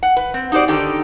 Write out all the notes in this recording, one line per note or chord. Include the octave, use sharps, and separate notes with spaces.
F#5
B4
C4
D#4 F#4 G4 C5 D5
D3 D#3 D#4 G4